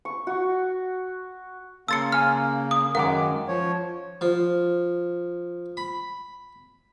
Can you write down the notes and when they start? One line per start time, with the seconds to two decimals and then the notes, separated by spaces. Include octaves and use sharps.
0.05 C#6
0.27 F#4
1.88 C#3 A#3 A5 C6 E6 A6 C#7
2.12 G#5 C6 F6
2.71 D#6
2.95 F#2 D#3 G#3 A#4 F5 F#5 D6
3.48 F3 C#5
4.21 F3
5.77 B5